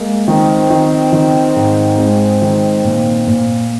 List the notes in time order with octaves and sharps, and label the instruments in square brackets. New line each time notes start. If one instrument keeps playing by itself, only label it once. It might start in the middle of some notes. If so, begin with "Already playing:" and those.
Already playing: [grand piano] G#3 [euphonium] A#3
[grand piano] D#3 [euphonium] C4
[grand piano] D#3
D#3
G#2
[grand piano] G#3 [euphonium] C4
[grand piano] D#3
A#2
A#2